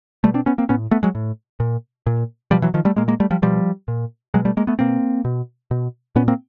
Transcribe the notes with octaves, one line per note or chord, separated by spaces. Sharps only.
B2 G3 A3
C4 D4
B3 C#4
A#3 C4
A2 B3 C#4
A3 B3
F#3 G#3
A2
A#2
A#2
B2 F3 G3
E3 F#3
D#3 F3
G3 A3
A#2 G#3 A#3
G#3 A#3
G3 A3
F3 G3
B2 F3 G3
A#2
B2 F#3 G#3
G3 A3
G#3 A#3
A3 B3
B2 A#3 C4
B2
B2
A#2 B3 C#4
A#3 C4